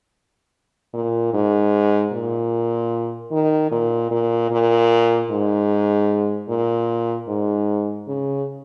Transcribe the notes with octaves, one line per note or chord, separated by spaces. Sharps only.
A#2
G#2
A#2
D#3
A#2
A#2
A#2
G#2
A#2
G#2
C#3